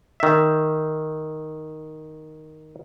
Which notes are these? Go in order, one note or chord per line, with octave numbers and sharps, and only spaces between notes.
D#3 E5